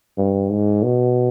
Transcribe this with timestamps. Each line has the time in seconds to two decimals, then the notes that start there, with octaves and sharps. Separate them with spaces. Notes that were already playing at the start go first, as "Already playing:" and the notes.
0.18 G2
0.50 G#2
0.83 B2